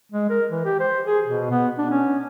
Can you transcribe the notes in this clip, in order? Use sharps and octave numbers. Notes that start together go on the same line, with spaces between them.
G#3
A#4
E3
G4
C5
G#4
B2
B3
D4
C#4